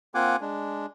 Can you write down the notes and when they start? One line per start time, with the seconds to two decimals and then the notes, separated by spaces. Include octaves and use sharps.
0.15 A#3 C4 F4 F#5 G#5 D6
0.41 G#3 D4